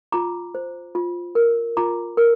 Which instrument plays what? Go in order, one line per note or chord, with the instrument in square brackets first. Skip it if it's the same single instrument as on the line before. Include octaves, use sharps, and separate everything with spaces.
[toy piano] F4 A#5 D6
C5
F4
A#4
F4 A#5 D6
A#4